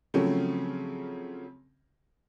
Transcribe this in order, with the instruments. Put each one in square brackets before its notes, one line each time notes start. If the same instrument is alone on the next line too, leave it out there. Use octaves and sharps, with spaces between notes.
[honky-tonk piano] C#3 F3 F#3 A3 C4 C#4